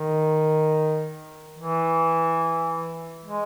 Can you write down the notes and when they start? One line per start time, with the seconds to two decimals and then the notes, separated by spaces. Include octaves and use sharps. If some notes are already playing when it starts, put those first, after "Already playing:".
Already playing: D#3
1.58 E3
3.25 G#3